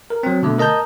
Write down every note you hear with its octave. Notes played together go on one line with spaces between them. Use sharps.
A#4
F#3 C4
B2 D3 A3
A#4 D#5 A5 A#5 G6